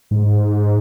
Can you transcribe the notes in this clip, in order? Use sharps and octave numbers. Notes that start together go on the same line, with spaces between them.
G#2